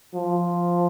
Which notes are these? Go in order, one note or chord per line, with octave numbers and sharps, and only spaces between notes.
F3